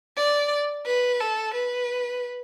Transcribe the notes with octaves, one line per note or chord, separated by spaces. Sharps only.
D5
B4
A4
B4